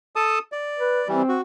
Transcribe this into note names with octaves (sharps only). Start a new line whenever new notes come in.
A4 A5 D#6
D5
B4
E3 G3 C4
F#4